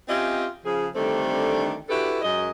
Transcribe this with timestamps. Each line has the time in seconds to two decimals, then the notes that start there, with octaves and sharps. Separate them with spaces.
0.09 C4 C#4 F4 G4 D#5 E5
0.64 C#3 F3 G#4
0.95 D3 D#3 G3 A3 C4 D4
1.89 D4 E4 F#4 G4 A4 B4
2.22 F#2 G#3 D#5